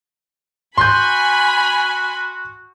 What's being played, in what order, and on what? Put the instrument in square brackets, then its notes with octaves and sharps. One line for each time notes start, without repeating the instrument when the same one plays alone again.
[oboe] F#4 [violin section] G#5 B5 [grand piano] C6 G6